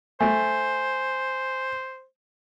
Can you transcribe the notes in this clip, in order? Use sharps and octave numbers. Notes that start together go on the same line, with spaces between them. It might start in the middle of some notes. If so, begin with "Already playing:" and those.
A3 C5 G#5